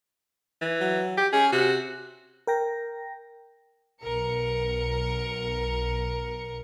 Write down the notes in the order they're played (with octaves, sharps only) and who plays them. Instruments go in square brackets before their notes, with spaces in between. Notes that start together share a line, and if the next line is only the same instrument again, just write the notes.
[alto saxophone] E3
[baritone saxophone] F#3
[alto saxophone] G4
[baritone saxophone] C#4 [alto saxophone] G#4
[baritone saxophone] C3 [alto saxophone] F#4
[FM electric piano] A#4 G5 A#6
[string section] B1 A#4 C#7